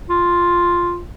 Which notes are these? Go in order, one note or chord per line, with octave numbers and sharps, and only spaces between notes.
F4